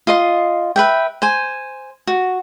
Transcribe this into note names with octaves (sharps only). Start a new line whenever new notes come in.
F4 D#5 C6
B4 E5 G5
C5 G#5
F#4